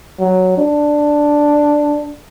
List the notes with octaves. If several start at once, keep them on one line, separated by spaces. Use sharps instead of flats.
F#3
D4